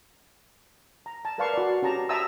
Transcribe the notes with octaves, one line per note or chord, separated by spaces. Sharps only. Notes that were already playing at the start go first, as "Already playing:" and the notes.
A#5
A5
A#4 B4 D5 F5 A5 C#6
F#4 D5
C#4 G4 A5 A#5
E5 G5 A5 A#5 D#6 E6